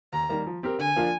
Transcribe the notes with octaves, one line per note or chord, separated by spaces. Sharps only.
D#2 A#5
D#3 G3 A#3
F3
C4 G4 A#4
D3 G#5
F3 A#3 D4 F4